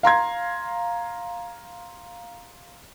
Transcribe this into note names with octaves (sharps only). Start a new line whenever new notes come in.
F5 A#5 C6 G#6